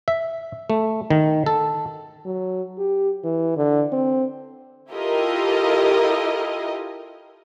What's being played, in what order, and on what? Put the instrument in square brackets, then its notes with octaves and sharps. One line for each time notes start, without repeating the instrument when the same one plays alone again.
[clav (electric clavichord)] E5
A3
D#3
A4
[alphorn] F#3
G4
E3
D3
C4
[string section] E4 F4 G4 A4 A#4 D#5